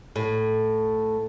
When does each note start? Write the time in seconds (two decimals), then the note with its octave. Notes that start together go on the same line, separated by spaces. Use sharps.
0.16 A2